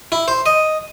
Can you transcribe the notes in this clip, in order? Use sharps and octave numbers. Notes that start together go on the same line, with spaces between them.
E4
C5
D#5